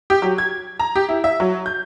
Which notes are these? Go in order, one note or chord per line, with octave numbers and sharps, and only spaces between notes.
G4
F#3
G#6
A#5
G4
E4
E5
F#3
G6